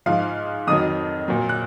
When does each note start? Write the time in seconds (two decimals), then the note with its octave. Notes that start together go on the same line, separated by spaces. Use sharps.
0.06 G#2 F3 F5
0.67 F2 D#3 F#3 D#6
1.28 A#2 F#3
1.49 F#6